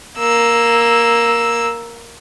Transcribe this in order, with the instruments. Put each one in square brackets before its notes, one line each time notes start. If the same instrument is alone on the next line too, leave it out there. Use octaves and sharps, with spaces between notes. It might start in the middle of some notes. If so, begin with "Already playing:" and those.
[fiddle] A#3 E6